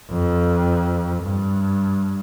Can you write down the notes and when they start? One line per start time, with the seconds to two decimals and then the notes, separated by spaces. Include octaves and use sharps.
0.10 F2
1.23 G2